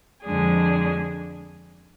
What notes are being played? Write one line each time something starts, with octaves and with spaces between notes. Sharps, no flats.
F2 D3 G#3 D4 G#4